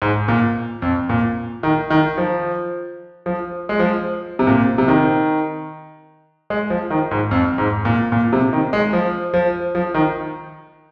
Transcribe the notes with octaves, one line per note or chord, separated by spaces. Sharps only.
G#2
A#2
F2
A#2
D#3
D#3
F3
F3
G#3
F3
C3
A#2
C3
D#3
G#3
F3
D#3
G#2
F2
G#2
A#2
A#2
C3
D#3
G#3
F3
F3
F3
D#3